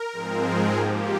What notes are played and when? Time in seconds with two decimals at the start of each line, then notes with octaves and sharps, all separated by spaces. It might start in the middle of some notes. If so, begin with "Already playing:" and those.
Already playing: A#4
0.13 G#2 F3 G#3 C4
0.45 G#4
0.76 G#2 F3 A#3 G4